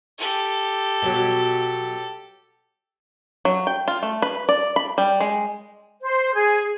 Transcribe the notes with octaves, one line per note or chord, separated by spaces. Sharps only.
G4 A4
B2 F#3
F#3
G5
F4
A3
B4
D5
B5
G3
G#3
C5
G#4